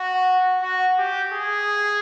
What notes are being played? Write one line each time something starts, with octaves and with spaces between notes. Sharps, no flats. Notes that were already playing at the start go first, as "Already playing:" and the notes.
Already playing: F#4
F#4
G4
G#4